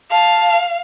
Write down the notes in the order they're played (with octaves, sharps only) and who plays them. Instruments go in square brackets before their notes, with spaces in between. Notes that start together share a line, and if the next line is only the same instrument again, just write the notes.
[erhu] F5 [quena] A5